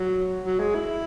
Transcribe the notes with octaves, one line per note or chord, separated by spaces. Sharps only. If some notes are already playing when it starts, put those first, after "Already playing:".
Already playing: F#3
F#3
G#3
E4